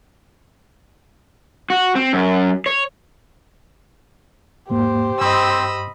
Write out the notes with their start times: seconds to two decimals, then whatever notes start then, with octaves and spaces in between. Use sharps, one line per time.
1.70 F#4
1.95 C4
2.13 F#2
2.66 C#5
4.70 E2 G#2 A#3 G4 C5
5.21 G2 C4 D#5 B5 E6